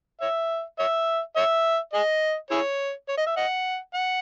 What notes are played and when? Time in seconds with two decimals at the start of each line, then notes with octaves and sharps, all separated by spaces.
0.21 C#5 E5
0.79 C#5 E5
1.37 C#5 E5
1.94 G#4 D#5
2.51 E4 G#4 C#5
3.09 C#5
3.18 D#5
3.27 E5
3.37 D#5 F#5
3.94 F#5